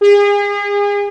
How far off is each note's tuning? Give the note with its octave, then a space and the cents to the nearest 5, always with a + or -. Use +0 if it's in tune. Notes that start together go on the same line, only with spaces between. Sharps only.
G#4 -35